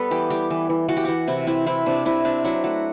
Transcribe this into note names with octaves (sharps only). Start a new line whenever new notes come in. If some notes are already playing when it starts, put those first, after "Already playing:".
Already playing: G3 B3 A4 B4
E3 G4
G3 G4
E3
E3
E3 F#4
G4
E3 F#4
C3 E4
C4 E4
C4 E4
C3 D4
C3 E4
C4 D4
F#3 E4
A3 F#4